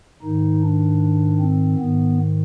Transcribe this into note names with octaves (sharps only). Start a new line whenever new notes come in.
G#2 D#3 D#4
D4
C4
G#2 D#3 B3